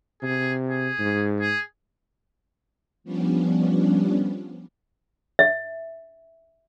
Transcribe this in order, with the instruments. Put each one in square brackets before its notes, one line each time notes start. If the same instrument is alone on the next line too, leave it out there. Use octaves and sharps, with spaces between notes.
[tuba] C3 [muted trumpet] G#4
[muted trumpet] G#4
[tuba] G#2
[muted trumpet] G#4
[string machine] F3 G3 B3 C#4 D4
[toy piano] E5